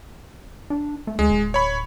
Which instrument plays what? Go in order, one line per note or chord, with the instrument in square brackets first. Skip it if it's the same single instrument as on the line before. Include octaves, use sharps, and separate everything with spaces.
[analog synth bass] D4
A3
[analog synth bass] D2 [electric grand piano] G#3
[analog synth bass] D1
[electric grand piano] C#5 B5